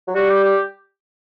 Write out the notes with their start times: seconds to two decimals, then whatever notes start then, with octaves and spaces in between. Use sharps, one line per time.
0.08 F#3
0.15 G3 F#4
0.30 G4
0.44 G4